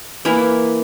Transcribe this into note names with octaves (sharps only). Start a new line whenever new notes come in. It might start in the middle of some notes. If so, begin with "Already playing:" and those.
E3 A#3 E4